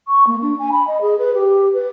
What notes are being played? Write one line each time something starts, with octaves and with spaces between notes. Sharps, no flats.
C#6
A#3
D4
G#5
B5
D#5
G#4
B4
G4
B4